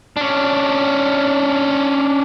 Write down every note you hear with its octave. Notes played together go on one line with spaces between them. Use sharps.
C#4 D4